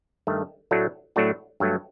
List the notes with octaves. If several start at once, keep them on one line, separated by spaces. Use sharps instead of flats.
G2 D#3 A3
A2 F#3 A3 D4 F#4
A2 F#3 A3 D4 F#4
G2 F#3 A3